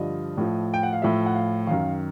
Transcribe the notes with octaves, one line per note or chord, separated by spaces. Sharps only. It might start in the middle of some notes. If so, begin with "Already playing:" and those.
Already playing: G2 D3 F3 D#5
A2 F3
G5
F#5
F5
A2 F3 E5
F#5
F5
F#2 D#3 F5